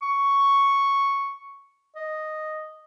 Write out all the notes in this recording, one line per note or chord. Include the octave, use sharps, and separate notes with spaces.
C#6
D#5